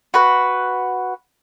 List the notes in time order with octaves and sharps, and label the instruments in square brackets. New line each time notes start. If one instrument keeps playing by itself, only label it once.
[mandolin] F#4 B4